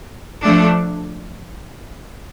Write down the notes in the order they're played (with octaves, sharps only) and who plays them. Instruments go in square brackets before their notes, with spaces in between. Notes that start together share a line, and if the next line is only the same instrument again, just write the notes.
[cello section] F3 A3 D4